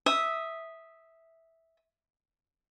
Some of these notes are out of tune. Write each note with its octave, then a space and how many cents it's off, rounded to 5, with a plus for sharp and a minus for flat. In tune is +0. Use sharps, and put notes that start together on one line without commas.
E5 -10 D#6 +0